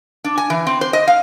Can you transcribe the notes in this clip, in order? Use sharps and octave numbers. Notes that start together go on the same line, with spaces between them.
D4
G#5
E3
C4
C5
D#5
F5